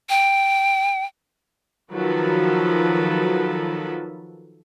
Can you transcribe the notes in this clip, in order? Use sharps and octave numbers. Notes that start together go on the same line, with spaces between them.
G5
D#3 F3 F#3 F#4 A4 B4